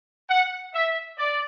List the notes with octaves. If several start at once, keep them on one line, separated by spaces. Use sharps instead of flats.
F#5
E5
D5